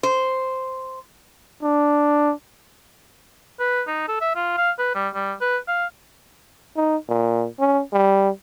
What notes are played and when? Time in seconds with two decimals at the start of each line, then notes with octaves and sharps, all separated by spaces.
0.03 C5
1.63 D4
3.60 B4
3.87 D#4
4.08 A4
4.21 E5
4.36 F4
4.57 F5
4.78 B4
4.95 G3
5.14 G3
5.41 B4
5.68 F5
6.76 D#4
7.08 A#2
7.59 C#4
7.93 G3